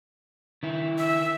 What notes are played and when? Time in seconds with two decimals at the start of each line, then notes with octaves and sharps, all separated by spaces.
0.63 D#3 E4
0.98 E5